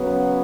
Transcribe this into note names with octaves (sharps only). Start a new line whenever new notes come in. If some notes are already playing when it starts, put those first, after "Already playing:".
Already playing: C#3 F#3 B3